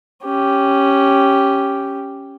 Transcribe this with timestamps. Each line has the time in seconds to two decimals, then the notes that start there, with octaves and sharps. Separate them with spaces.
0.24 C#4 G4